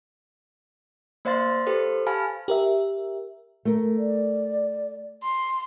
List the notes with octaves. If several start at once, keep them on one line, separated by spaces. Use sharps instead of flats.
A#3 C5 D5 F5 C6 A6
G4 A4 B4 C5
G4 F5 G#5 A5 B5 F6
G4 A#4 E5
A3 A#4
D5
C6